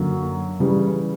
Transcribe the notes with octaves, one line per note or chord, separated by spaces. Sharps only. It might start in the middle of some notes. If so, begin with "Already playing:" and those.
Already playing: F#2 D3 F#3 A#3
C#3 E3 G3